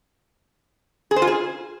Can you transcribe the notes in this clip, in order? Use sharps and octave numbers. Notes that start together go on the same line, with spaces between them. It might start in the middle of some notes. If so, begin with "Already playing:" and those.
G#4
C5
F4
G#4